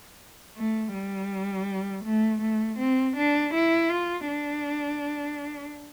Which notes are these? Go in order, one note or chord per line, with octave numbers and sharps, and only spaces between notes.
A3
G3
A3
A3
C4
D4
E4
F4
D4